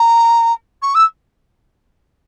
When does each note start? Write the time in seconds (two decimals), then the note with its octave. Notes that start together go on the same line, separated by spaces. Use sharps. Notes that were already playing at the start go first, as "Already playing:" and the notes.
Already playing: A#5
0.82 C#6
0.94 E6